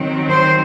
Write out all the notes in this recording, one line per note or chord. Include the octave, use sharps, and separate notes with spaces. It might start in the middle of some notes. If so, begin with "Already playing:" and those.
Already playing: D#3 F#3 C4
C5